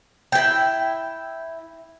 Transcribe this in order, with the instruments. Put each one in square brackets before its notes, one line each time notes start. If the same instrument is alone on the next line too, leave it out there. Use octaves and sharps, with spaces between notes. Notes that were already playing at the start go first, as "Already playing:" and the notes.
[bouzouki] E4 G5